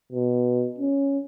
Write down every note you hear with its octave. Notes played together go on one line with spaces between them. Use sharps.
B2
C#4